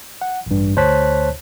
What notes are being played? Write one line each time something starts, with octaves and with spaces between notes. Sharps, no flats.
F#5
A1 G2
D2 C5 C#5 A5 F#6 B6